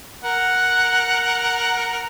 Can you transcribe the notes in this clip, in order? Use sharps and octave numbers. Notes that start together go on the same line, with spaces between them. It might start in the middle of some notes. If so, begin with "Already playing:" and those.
A#4 F#5